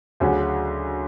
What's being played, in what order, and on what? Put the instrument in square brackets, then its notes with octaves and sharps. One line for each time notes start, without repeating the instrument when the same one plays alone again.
[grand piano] D2 C#3 F#3 C#4 F#4